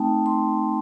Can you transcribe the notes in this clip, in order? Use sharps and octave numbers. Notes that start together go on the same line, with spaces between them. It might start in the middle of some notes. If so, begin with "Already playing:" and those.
Already playing: A3 C4 D#4 G5 A5
C6